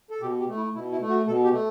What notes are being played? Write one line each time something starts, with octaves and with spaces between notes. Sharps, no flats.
A4
B2 G4
G4
A3
E4
B2 E4
E4
A3
F#4
B2 A4
G4
A3